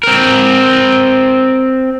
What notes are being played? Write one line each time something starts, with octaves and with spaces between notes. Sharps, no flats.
C4 A#4